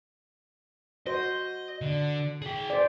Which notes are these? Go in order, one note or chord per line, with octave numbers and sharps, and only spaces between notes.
F#4 C5 D#5
D3
G#4 G5
C5 D5